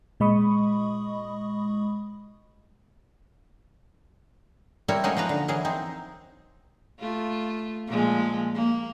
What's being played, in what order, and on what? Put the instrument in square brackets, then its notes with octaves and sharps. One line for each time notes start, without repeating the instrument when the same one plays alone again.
[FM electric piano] A#2 G#3 D#5 B5 C#6 D#6
[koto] G3 C4 E4 A#4 C#5
F#3 G#3 A3 C#4 D#4 A#4
F3 A#3 B4 A#5
D3
E3 F#3 G#4 A#4
C4 D#4
[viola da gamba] A3 F4
A#2 F3 G#3
A#3